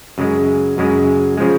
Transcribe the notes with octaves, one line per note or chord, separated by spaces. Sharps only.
F#2 C#3 G#3
F#2 C#3 G#3
C#3 F3 G#3